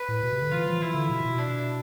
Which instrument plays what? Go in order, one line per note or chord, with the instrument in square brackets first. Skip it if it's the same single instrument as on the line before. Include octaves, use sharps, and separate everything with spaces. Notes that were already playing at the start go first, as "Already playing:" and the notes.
Already playing: [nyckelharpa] B4
[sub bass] A2
B2
C3
D3
[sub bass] E3 [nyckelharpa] F4
[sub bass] F3
[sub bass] E3 [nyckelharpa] E4
[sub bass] D3
B2
B2
[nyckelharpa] D4